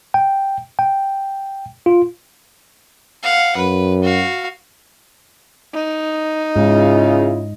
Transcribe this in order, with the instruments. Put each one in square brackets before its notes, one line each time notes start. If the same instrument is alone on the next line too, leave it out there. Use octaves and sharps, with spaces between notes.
[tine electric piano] G5
G5
F4
[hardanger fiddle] F5 F#5
[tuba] F#2 [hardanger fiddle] B4
[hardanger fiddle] F#4 F5
[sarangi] D#4
[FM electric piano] G#2 [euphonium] C#3 [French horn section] G#3 E4 F4